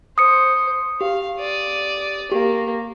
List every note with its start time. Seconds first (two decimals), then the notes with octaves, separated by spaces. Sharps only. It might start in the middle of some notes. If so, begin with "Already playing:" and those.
0.18 C5 D#6 C#7
1.01 G4 F5
1.39 D5 D#6
2.32 A#3 G4